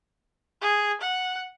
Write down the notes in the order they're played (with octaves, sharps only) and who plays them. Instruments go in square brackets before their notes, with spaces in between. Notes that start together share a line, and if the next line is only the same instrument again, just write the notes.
[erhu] G#4
F#5